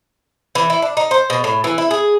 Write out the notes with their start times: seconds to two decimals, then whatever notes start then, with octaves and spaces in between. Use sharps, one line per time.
0.55 E3
0.70 E4
0.82 D4
0.97 D#4
1.11 C5
1.30 B2
1.44 A2
1.64 E3
1.78 E4
1.91 G#4